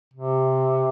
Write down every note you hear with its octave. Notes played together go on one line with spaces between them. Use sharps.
C3